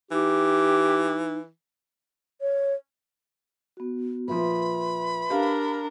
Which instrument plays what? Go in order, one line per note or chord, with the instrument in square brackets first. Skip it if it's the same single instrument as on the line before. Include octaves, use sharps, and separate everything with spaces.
[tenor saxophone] E3 [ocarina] D#4 [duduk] G4
[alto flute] C#5
[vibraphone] B3 F#4
[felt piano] A#2 F3 [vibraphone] B4 E5 C6 [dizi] B5
[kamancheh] D4 A#4 [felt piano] G4 F5